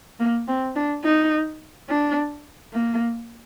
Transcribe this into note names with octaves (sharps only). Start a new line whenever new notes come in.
A#3
C4
D4
D#4
D4
A#3